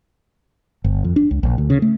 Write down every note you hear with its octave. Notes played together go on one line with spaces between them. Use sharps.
G1
F2
D4
C#2
A#1
D2
C#3
A3